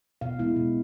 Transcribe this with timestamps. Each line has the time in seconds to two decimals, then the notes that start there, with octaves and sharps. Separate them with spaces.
0.21 B2 F5
0.39 G#3 B3 E4
0.56 B2